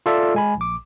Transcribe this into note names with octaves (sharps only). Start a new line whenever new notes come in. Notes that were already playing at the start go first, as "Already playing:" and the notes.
F4 A4 D5 E5
G#3 G#5 B5
A#1 D6